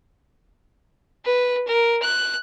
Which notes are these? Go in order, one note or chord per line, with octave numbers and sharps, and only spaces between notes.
B4
A#4
F#6